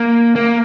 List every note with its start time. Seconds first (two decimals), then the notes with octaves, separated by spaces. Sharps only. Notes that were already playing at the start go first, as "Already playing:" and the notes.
Already playing: A#3
0.36 A#3